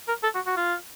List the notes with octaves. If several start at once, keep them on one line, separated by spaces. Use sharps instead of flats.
A#4
A4
F#4
F#4
F4